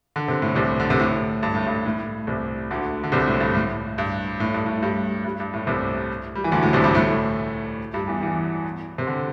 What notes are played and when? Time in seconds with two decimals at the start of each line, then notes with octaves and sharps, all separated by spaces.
0.16 D3
0.28 C3
0.42 A2
0.55 C2 C3
0.80 D3
0.90 C3
1.00 A2
1.43 G2
1.55 A2
1.66 G2
1.86 A2
2.27 C2 C3
2.71 D2 D3
3.04 D3
3.12 C2 C3
3.27 A2
3.40 G2
3.55 A2
3.98 G2
4.40 A2
4.54 G2
4.66 A2
4.82 G2 G3
5.24 G2 G3
5.40 G2
5.54 A2
5.67 C2 C3
6.35 G3
6.44 E3
6.52 D2 D3
6.63 A2
6.73 C2 C3
6.84 G2 G3
6.95 A2 A3
7.94 G2 G3
8.08 E2 E3
8.22 E2 E3
8.98 C3
9.07 D3